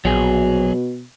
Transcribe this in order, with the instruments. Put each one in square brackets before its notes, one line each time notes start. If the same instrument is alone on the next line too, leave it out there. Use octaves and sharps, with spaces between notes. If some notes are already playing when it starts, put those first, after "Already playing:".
[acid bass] A#1 [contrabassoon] B2 [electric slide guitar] F#3 G#4